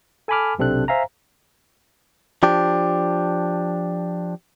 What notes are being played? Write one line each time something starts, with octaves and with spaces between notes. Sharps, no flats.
A4 G#5 A5 B5 D6 F6
B1 C3 C4 D4 A4 F#6
C5 E5 F5 G#5 A#5
F3 D4 G4